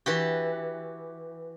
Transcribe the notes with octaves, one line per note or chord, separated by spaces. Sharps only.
E3 F#4 G4